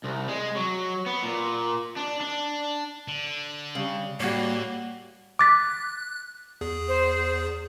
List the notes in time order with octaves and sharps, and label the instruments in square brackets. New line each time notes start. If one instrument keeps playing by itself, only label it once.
[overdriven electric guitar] C2
G#3
F#3
B3
A#2
D4
D4
[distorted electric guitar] D3
[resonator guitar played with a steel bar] C#3 [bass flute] G3
[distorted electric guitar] A2 [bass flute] G3 [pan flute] A#3 [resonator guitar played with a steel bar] F#4 C#5
[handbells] D6 A6 B6 [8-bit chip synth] F#6
[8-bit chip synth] E2 G#4
[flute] C5